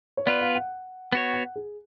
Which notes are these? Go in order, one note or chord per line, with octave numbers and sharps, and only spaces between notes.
C#5
B3 F4 B4 D5
F5
F#5
B3 F#4 C#5
F#5
G#4